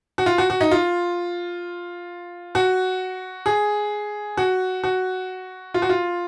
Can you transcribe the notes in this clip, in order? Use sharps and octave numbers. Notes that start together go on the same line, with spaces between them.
F#4
F4
F#4
F#4
D#4
F4
F#4
G#4
F#4
F#4
F4
F#4
F4